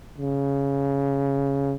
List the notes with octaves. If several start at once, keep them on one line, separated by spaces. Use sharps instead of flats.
C#3